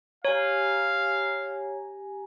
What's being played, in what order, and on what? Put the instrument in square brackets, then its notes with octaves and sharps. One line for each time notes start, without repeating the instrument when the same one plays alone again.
[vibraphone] G4 G#5 A#5 [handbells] C#5 [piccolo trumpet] F5